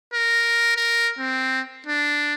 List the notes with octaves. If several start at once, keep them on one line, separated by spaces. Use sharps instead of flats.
A#4
A#4
C4
D4